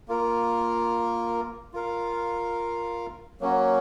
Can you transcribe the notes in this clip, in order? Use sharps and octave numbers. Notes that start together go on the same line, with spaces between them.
A#3 F4 A#4
F4 A#4 F5
F#3 A#3 C#4 F#4